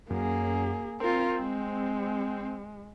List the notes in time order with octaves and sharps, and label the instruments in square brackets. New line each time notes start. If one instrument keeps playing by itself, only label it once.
[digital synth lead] F#2 [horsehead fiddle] A#3 G#4
[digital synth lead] C4 [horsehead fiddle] F4 A#4
[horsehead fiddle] G#3